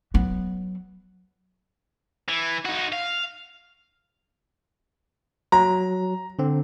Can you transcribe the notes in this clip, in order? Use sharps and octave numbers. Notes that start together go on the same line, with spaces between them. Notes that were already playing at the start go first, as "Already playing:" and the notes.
F#3 B3
E3
D#4 F#4
F5
F#3 A#5
D3 C4